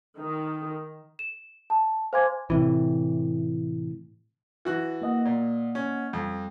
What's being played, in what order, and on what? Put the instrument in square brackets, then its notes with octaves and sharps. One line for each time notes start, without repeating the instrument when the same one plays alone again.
[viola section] D#3
[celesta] E7
A5
C5 F5 G#5 C6 D6 G#6
[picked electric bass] A2 C3 E3
[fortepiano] E3 F#4 F#6
[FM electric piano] A#3 D#5 F#5
[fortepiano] A#2
C#4
[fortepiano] F2 [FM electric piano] G3